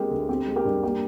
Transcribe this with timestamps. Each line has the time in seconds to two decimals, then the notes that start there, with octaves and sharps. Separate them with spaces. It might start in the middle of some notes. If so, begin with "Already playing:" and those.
Already playing: G#3 C4 G4 A#4
0.11 D2
0.29 C4 G4
0.47 G#3
0.56 G4 A#4
0.65 G2
0.83 A#3 G4